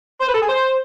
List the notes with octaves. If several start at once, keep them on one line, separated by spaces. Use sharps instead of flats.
C5
B4
A4
G#4
C5